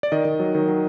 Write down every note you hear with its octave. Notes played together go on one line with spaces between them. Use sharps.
D5
D#3 D#5
D#3
F#3
D#3
F#3